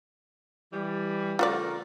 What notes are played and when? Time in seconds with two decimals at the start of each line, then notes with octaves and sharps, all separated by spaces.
0.73 E3 G3
1.39 C#3 A3 F4 F#4 A#4 D5